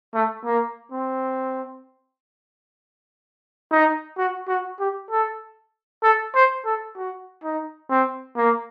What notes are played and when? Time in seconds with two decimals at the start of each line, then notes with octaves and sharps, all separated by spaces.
0.14 A3
0.45 A#3
0.92 C4
3.71 D#4
4.18 F#4
4.48 F#4
4.80 G4
5.11 A4
6.03 A4
6.35 C5
6.66 A4
6.97 F#4
7.44 D#4
7.90 C4
8.37 A#3